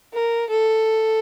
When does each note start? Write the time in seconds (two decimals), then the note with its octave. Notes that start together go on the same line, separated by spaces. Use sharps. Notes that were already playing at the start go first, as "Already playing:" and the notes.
0.14 A#4
0.50 A4